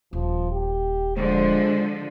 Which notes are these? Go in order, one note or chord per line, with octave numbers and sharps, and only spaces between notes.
D#1 F3
G4
D3 F3 G#3 C5